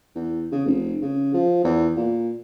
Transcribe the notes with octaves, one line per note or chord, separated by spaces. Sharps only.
E2
C#3
F1
C#3
F3
E2
A#2